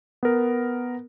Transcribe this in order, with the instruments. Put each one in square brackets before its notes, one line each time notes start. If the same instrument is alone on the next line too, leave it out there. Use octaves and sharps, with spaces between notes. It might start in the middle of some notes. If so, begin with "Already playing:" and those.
[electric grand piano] B3 A#4